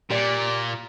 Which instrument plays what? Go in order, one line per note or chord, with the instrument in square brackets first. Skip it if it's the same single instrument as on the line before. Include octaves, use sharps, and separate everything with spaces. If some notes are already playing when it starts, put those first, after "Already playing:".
[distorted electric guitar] A#2 [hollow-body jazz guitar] G4 D5